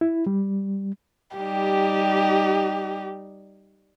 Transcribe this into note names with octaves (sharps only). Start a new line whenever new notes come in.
E4
G3
G3 D#4 G4